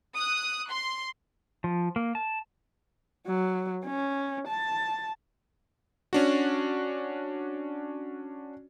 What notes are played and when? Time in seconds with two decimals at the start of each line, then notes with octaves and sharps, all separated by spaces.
0.17 D#6 F#6
0.71 C6
1.64 F3
1.96 A#3
2.15 A5
3.27 F#3
3.84 C#4
4.47 A5
6.13 C#4 D4 F#4